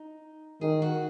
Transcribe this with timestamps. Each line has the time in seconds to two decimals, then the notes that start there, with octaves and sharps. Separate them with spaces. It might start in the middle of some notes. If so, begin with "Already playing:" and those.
Already playing: D#4
0.61 D#3 G#4
0.82 F#4